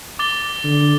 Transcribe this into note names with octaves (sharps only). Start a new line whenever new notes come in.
D6 A6 G7
D3